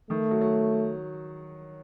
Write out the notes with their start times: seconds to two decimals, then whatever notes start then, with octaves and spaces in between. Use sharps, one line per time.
0.10 D#3 A3
0.31 F#3
0.41 F#3